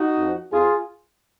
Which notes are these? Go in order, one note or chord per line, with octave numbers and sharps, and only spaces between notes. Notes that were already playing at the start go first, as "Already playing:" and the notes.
Already playing: D#4 F#4
F2 F3
F2 F3 F4 G#4